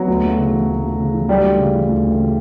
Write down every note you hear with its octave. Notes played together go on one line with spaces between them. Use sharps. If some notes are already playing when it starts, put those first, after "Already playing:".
Already playing: F#3 B3
D2
A3
C#3
E3
D2
A3
C#3
E3
D2 G3
A3
C#3
E3
D2
A3
C#3